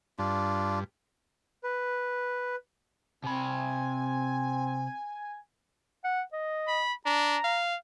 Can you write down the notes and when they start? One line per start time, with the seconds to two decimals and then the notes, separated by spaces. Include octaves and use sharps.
0.19 G2 D4 F4
1.64 B4
3.24 C3 C4 G#5 B5
6.04 F#5
6.33 D#5
6.68 B5
7.06 D4 A#5
7.44 F5